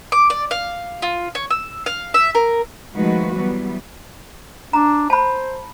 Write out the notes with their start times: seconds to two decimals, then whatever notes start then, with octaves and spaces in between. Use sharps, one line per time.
0.12 D6
0.30 D5
0.51 F5
1.02 F4
1.35 C#5
1.50 E6
1.86 F5
2.14 E5
2.35 A#4
2.96 D#3 F3 G#3 A3 F#4 B4
3.35 E3 F#3 G3 B3
4.73 D4 A#5
5.10 C5 A5 B5